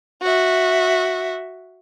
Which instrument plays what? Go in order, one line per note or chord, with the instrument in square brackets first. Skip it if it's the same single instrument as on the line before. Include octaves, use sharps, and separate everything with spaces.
[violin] F#4 E5